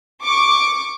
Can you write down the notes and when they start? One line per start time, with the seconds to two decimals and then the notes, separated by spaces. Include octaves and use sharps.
0.23 C#6 D6